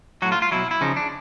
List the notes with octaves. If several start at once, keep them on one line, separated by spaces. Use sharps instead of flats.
A2 F#3 F#4
F4
F4
B2 F#3 E4
E4
C#3 F3 D#4
D4